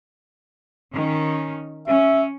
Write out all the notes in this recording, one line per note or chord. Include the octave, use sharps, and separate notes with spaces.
D#3 C#4
C#4 E5